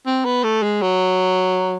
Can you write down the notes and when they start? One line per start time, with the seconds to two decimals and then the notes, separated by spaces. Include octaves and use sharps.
0.06 C4
0.25 B3
0.44 A3
0.63 G#3
0.82 F#3